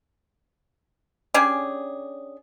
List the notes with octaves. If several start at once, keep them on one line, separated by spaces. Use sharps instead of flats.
C#4 D4 G4 G#4